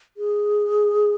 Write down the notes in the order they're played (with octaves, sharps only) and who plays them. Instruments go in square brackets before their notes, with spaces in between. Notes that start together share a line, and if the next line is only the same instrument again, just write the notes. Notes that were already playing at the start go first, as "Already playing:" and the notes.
[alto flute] G#4